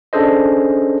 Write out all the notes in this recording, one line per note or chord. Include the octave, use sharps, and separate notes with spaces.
C#4 D4 G#4 A4 C5 D#5